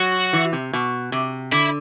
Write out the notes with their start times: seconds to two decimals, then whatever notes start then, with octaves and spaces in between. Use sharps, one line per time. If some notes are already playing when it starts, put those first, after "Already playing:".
Already playing: F#3 F#4
0.33 E3
0.53 C3
0.73 B2
1.12 C3
1.52 D3 E4